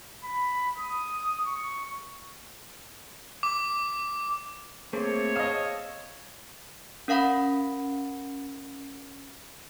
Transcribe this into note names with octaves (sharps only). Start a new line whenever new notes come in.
B5
D#6
C#6
D6
A3 A#3 C4 G#4 C5 C#5
D#5 F5 A5 D#6 E6
C#4 A#4 F5 F#5 B5